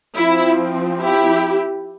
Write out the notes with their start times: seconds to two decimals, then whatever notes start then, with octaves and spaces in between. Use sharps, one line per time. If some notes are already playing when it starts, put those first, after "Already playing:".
0.18 F3 C4 E4
1.02 E4 G4